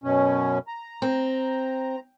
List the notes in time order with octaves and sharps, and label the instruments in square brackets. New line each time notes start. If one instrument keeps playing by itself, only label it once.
[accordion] F#2 B2 C#4
A#5
[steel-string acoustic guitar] C4